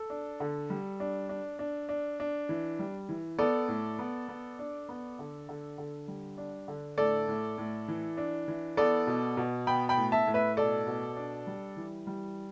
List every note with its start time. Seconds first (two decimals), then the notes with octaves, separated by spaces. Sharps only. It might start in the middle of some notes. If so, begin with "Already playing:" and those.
Already playing: A4
0.10 D4
0.40 D3
0.70 G3
1.00 D4
1.29 D4
1.59 D4
1.89 D4
2.20 D4
2.49 E3
2.79 G3
3.09 E3
3.38 B3 A4 D5
3.68 A2
3.99 B3
4.28 B3
4.59 D4
4.89 B3
5.19 D3
5.49 D3
5.78 D3
6.08 G3
6.38 D4
6.68 D3
6.98 A2 A4 D5
7.28 A2
7.58 A2
7.88 E3
8.17 D4
8.48 E3
8.77 B3 A4 D5
9.07 B2
9.37 B2
9.67 B3 G5 B5
9.89 G5 B5
9.97 A2
10.12 E5 A5
10.27 A2
10.34 B4 E5
10.57 B2 A4 D5
10.87 B2
11.17 D4
11.47 G3
11.76 E3
12.07 G3